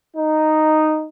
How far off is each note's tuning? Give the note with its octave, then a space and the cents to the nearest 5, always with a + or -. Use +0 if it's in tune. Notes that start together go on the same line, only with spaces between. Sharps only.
D#4 -5